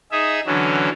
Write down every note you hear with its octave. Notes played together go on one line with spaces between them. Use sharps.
D#4 G#4 E5
D3 E3 F#3 C#4